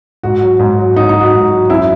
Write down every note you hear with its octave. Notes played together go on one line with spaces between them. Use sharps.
G#2 F#4
F#3
G#2
F#3
G#2 D#4
D#4
F#3
F#4
G#2
F#3
F#2 E4